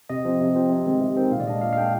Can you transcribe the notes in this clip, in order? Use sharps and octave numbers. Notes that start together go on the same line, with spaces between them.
C3 D#5
F3 C4
C3
F3 C4
C3
D#3 G#3 C4
C3
D#3 G#3 C4
A#2 F5
D5
G#3 D4 D#5
A#2 F5
F5
G#3 D4 G5